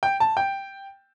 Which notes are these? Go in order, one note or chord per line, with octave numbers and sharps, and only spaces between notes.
G5
A5
G5